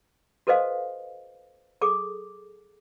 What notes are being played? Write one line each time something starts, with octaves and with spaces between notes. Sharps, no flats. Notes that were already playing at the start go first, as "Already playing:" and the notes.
F#4 A4 B4 C5 D#5 F5
G#4 A4 D6